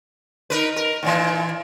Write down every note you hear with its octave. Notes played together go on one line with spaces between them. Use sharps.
D#4 A#4 B4
A#4
D#2 A#2 E3